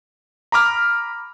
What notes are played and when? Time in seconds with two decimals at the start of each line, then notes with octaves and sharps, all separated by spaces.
0.52 A#5 B5 D6 F6